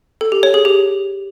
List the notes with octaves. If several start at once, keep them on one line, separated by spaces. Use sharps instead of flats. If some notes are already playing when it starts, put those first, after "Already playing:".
A4
G4
C#5
G#4
G4